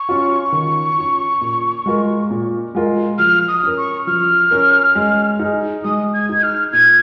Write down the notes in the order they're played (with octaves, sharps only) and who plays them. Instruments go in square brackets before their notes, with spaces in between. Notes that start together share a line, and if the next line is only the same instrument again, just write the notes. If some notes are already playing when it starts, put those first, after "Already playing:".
Already playing: [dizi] C#6
[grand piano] C#4 F4
D#3
C#4 F4
A#2
G#3 F4 A#4
A#2
G#3 F4 A#4
[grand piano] F3 [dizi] F6
[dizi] D#6
[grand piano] C#4 A#4
[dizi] C#6
[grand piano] F3 [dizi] F6
[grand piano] C#4 A#4
G#3
D#4 G#4
[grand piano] G#3 [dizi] D#6
[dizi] G#6
[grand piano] D#4 G#4
[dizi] G#6
F6
[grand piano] A#2 [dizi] G#6